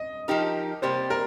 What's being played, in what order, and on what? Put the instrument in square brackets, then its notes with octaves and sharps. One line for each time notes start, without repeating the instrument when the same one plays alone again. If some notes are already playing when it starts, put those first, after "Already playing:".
Already playing: [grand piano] D#5
[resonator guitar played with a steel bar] F3 D#4 G4 A#4
[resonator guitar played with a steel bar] C3 G3 A#3 [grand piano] C5
[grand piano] A#4